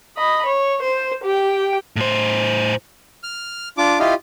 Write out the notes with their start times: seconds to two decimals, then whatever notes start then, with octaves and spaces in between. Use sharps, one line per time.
0.17 D#5 B5
0.46 C#5
0.82 C5
1.24 G4 G5
1.96 A2 C5
3.23 F6
3.78 D4 F4 D6
3.99 E4 F4 G4 D#5 F5